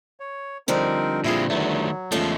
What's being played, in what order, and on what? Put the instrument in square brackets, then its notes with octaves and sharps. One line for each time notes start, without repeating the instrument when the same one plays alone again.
[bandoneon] C#5
[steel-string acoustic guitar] D3 F3 G3 [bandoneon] C4 D#4 A#4
[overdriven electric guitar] A#2 C4 [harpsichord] E4 F4 G#4
[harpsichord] E2 [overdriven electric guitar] D#3 A3 [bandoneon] F#3
[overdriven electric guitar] E2 A3 [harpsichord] F3 [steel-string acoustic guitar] G#3 C#4 A4